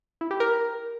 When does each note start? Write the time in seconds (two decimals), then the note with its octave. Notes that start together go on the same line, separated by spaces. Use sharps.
0.21 E4
0.31 G4
0.40 A#4